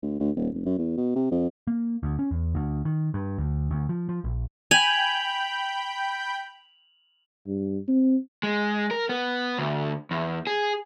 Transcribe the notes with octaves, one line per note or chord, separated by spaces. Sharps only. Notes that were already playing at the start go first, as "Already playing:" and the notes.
D2
D2
D#1
F1
F#2
E2
B2
C3
F2
A#3
D2
C#4
E2
D2
D#3
G2
D2
D2
F3
F3
A#1
G5 G#5 B5 G6 F7 F#7
G2
C4
G#3
A#4
B3
D2
E2
G#4